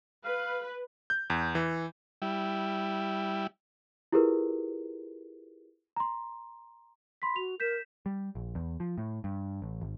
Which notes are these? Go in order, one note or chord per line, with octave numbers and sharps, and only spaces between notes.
B4 F5
G6
E2
E3
G3 E4
E4 F4 G4 G#4 A#4 B4
A#5 C6
B5 C6 B6
F#4 F7
A#4 G6 B6 E7
G3
A#1
E2
F3
A2
G2
A1
G#1